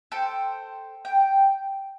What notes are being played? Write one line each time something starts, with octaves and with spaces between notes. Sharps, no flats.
A4 C5 G5
G5